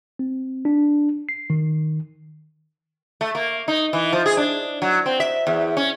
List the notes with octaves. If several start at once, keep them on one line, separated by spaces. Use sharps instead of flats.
C4
D4
C7
D#3
A3
A#3
D#4
E3
F3
G#4
D4
F#3
C4
E5
E2
C#4